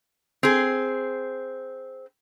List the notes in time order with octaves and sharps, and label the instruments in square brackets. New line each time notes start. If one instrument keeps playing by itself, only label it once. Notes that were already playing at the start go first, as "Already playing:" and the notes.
[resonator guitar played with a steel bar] C4 G#4